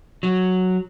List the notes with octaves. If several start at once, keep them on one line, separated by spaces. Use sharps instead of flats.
F#3